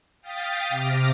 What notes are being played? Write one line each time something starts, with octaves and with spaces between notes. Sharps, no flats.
F5 G5 D#6 A6 B6
C3 D6 F6 A#6